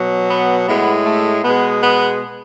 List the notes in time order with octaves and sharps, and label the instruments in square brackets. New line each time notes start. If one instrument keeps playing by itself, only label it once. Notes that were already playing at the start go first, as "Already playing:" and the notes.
Already playing: [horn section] B2 F#3
B3
A2 G#3 B3
A3
B2 G#3 B3
B3